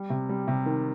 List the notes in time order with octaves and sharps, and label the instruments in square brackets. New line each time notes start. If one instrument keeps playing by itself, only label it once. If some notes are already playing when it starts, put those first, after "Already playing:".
Already playing: [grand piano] G3
C3
G3
C3
D#3